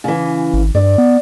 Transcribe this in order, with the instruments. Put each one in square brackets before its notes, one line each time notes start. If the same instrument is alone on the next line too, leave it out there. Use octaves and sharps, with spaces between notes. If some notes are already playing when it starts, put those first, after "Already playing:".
[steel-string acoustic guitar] C#3 E3
[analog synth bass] G#1
[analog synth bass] G2 [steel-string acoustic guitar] D5
[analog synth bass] B3